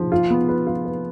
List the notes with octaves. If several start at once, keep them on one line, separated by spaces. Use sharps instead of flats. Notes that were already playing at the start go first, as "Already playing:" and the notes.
Already playing: F3
F4
B3
B4
F4
B4